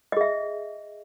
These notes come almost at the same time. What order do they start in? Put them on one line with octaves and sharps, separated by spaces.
D#5 G#4 E5